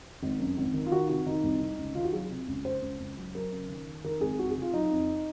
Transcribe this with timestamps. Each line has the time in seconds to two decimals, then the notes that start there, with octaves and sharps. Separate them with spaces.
0.23 G#1
0.39 F#2
0.57 G#1
0.74 D#3
0.86 F4
0.91 D#3 F#4
1.08 C3 F#4
1.26 D#3 D#4
1.43 C2
1.61 C3
1.78 C#2
1.95 D#3 F4
2.04 F#4
2.13 F#3 G#4
2.30 C3
2.47 C#2
2.65 C#2 C5
2.82 C#2
3.00 C#2
3.17 F#3
3.35 F#3 A#4
3.52 C#3
3.70 D#3
3.87 D#3
4.04 D#3 A#4
4.21 G#1 G#4
4.39 F2 F#4
4.50 G#4
4.56 C3
4.62 F4
4.74 F#3 D#4
4.91 F2